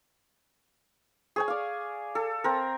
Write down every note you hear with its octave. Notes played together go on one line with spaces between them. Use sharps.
G#4 C#5 G#5
D5 F5
A4
C4 A#4